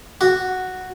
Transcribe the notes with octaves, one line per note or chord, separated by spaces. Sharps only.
F#4